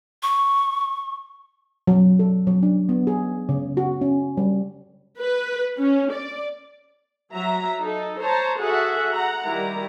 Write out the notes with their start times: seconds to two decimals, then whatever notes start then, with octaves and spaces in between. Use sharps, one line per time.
0.22 C#6
1.87 F#3
2.19 A4
2.47 F#3
2.63 D4
2.89 B3
3.07 G#4
3.49 C#3
3.77 F#4
4.01 C#4
4.37 G3
5.20 B4
5.78 C#4
6.12 D5
7.32 F#3 E5 A#5
7.78 D#4 A4
8.21 C5 C#5 A5 A#5
8.58 F#4 G#4 A4 E5 F#5
9.14 F#5 A#5
9.44 D#3 G3 E4 A#5